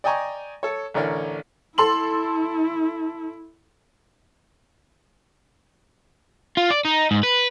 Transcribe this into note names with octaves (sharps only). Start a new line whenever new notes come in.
D5 D#5 G5 G#5 A#5 C#6
A4 C#5
A1 D3 A#4 C#5 D5
E4 A4 C6 F#7
F4
D5
D#4
G#2
B4